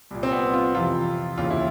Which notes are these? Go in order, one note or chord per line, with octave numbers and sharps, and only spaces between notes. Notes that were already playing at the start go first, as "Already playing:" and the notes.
C2 A#2
C4
B3
F4
F2 C3 E3 F4
D#2 C#3 E3 F4
E4